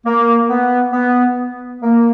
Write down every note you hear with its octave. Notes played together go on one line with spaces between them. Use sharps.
A#3
B3
B3
A#3